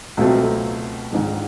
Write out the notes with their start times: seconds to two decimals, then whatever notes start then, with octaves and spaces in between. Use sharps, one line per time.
0.17 C#2 B2 F#3 A3 C4
1.12 A#1 G#2 D#3